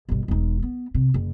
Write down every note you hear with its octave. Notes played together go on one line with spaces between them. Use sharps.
G1 B2
E1 D#4
B3
C3
F#1